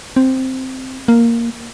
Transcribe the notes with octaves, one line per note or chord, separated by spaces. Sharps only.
C4
A#3